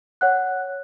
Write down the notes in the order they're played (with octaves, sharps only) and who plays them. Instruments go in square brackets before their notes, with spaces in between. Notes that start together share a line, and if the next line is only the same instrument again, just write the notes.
[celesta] C#5 F#5 F#6